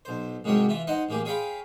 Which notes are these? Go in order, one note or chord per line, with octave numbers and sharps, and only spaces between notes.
B1 C5
C2 G#2 F#3 C#4 G4 C#5
E3 F4 E5
D#4 C5 D#5 F#5
A1 A#3 G4 G#4
G#4 C#5 F5 G5 B5 C6